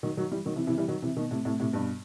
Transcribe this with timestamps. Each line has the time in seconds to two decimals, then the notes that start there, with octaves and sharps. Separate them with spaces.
0.03 D#3 F#3
0.17 D#3 F#3
0.31 E3 G3
0.45 D#3 F#3
0.56 C3 E3
0.67 C3 E3
0.78 E3 G3
0.88 D#3 F#3
1.02 C3 E3
1.17 B2 D#3
1.31 A2 C3
1.45 A2 C3
1.60 A2 C3
1.73 G2 B2